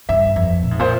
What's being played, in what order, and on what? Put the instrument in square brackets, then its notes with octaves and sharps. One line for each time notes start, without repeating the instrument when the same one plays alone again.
[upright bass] G2 [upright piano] E5
[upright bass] F2
A#2
G#2
[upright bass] A#2 [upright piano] C5